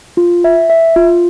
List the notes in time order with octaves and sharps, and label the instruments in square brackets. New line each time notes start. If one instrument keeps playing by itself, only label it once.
[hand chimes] F4
E5
E5
F4